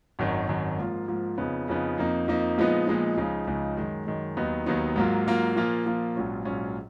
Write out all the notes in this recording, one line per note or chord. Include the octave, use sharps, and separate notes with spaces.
G#1 F#2 D#3
G#1 F#2 D#3
G#2 F3 A#3 F4
G#2 F3 A#3 F4
F2 C#3 F3 B3 D#4
F2 C#3 F3 B3 D#4
F2 F3 A#3 D#4
F2 F3 A#3 D#4
A#2 F3 G#3 B3 D#4
A#2 F3 G#3 B3 D#4
C#2 C#3 F3 G#3 D#4
C#2 C#3 F3 G#3 D#4
F#2 D#3 G#3
F#2 D#3 G#3
D#2 D#3 F#3 B3 D#4
D#2 D#3 F#3 B3 D#4
G#2 F#3 A#3 F4
G#2 F#3 A#3 F4
A#2 F3 A#3 F4
A#2 F3 A#3 F4
A#1 G#2 F#3 C#4 F4
A#1 G#2 F#3 C#4 F4